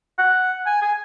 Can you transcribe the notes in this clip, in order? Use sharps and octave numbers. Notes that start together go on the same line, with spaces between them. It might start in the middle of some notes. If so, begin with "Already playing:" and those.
F#5
G#5
G#5